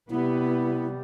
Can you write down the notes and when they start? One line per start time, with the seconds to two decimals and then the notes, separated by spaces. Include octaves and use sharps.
0.10 C3 G3 B3 E4